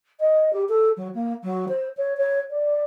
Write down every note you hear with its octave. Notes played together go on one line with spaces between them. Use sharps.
D#5
G4
A4
F#3
A#3
F#3
C5
C#5
C#5
D5